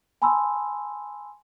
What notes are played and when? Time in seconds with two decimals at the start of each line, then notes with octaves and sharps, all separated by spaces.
0.22 G#5 A5 B5 C6 D#6 E6